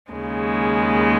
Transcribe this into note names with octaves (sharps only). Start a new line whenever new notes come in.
D#2 C#3 G#3